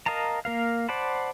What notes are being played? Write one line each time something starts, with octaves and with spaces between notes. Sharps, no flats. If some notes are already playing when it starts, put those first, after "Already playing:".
A#4 D#5 F5 A5 A#5
A#3 A#4 F5
C5 D5 F#5 A5 B5